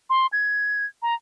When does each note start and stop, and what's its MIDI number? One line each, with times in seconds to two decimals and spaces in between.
0.10 0.27 84
0.33 0.86 92
1.02 1.14 82